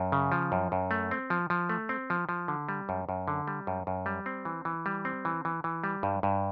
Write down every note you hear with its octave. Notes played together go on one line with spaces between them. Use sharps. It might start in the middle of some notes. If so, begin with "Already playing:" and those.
Already playing: F#2
C#3
F3
F#2
F#2
A3
C4
F3
F3
A3
C4
F3
F3
D3
G3
F#2
F#2
D3
G3
F#2
F#2
G3
C4
E3
E3
G3
C4
E3
E3
E3
G3
G2
G2